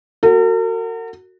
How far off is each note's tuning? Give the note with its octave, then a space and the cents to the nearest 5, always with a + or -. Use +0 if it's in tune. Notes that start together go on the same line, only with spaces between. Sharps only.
F#4 +0 A#4 -45